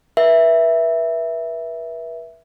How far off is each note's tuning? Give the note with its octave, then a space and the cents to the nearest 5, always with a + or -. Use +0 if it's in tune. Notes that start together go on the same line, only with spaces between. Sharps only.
B4 -35 E5 +0